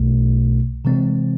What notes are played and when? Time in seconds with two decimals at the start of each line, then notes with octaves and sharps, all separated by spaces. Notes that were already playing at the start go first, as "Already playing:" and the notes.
Already playing: B1 B2 A3
0.85 C3 E3 G#3 C4